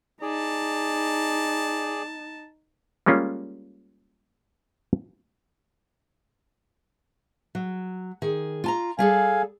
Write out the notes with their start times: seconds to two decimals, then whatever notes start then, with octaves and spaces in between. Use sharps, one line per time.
0.22 D#4 G#4 D5 A5
3.06 G3 G#3 A#3 C#4 F4
7.55 F#3
8.22 D#3 G#4
8.64 F4 A5 A#5
8.99 G3 G#4 A4 F5 G#5